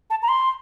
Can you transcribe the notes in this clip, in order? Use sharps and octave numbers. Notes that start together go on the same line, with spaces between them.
A5
A#5
C6